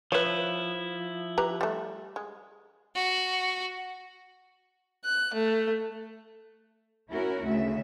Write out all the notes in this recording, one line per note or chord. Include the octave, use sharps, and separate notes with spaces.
F3 E4 B4 C#5
G4 B4 A#5
G3 A3
G#3
F#4
F#6
A3
C#4 E4 F#4 A#4
D2 C#3 E5